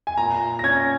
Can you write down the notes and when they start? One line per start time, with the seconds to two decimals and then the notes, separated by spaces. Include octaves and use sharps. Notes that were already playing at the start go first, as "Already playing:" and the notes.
0.07 G#5
0.17 A#2 A#5
0.59 A#6
0.64 C#4 G#6